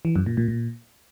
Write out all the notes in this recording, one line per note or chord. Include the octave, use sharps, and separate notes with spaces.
E3
F#2
A#2
A#2
A#2